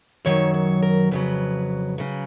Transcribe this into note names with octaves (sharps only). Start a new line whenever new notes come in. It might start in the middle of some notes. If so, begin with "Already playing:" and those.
F#2 D#3 F#3 C#5
C#5
A#4
F2 C#3 F#3 B4
C#3 F#3